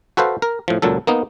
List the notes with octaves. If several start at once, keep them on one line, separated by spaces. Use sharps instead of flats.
F#4 A4 B4 C5 F5
A#4
A2 F3
C#2 A#2 F#3 A4
A#3 B3 D#4